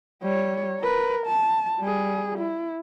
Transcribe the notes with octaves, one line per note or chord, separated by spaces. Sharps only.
G3 C#5
A#4 B4
A5
G3 G#4
E4